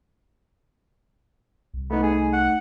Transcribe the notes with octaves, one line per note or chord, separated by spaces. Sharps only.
C2
A3 B3 D#4
G#4
F#5